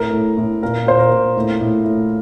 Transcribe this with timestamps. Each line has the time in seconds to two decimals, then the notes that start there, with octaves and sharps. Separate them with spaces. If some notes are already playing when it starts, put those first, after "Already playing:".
Already playing: A2 A#4
0.13 A2
0.37 A2
0.63 A#2 A#4
0.86 A#2 C5
0.99 A#4
1.11 A#2
1.36 A2
1.61 A2
1.84 A2